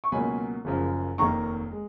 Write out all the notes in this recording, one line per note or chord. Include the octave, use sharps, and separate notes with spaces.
C#6
C#2 B2 F#3 A#3 C#4 G#5 B5
F#1 F#2 C#3 F3
F1 D#2 D#3 A#3 A#5 C#6
G#3